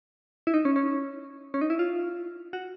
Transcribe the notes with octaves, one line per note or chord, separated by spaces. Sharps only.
E4
D#4
C#4
C#4
C#4
D#4
E4
F4
F#4